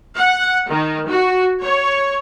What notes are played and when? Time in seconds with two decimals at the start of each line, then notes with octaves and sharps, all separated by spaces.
0.17 F#5
0.69 D#3
1.10 F#4
1.62 C#5